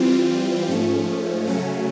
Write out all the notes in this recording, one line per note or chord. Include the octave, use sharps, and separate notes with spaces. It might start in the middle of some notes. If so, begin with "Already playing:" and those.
Already playing: E3 G3 C4 F4
G#2 F3 A3 C#4
C#3 F#3 A3 C#4